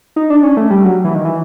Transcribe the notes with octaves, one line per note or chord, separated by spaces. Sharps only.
D#4
D4
C#4
A3
G3
F#3
E3
D#3
E3